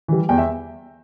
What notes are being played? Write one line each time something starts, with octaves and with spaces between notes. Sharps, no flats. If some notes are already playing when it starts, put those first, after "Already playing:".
E3 G3
E2 G5
E5